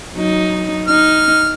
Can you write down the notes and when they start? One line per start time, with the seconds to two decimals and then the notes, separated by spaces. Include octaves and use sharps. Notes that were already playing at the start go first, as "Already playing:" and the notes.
0.14 F#3 D#4
0.88 D#4 F6